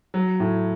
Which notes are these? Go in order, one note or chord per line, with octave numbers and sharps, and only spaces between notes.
F#3
A2